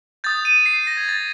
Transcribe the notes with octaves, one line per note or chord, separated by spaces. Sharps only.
D#6 G6 A6
D#7
C7
A#6
G#6
A6